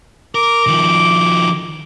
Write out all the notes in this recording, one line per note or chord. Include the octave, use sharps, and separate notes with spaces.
A#4 D6
D#3 F3